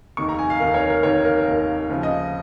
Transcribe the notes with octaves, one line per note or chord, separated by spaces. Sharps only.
F1 D#2 D#3 C#6
A#5
G#5
F5
F1 D#2 D#3 A#4
C#5
A#4
F1 D#2 D#3 C#5
A#4
F1 D#2 D#3 A#4
D#2 C#3 F3
D#5